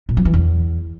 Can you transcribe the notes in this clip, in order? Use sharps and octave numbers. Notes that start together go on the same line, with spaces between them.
A#2
F3
E3
E2